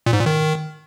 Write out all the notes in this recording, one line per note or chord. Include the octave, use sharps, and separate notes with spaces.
A#2
G#2
A#2
D#3